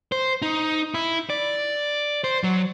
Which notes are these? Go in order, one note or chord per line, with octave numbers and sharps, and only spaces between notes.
C5
D#4
E4
D5
C5
F#3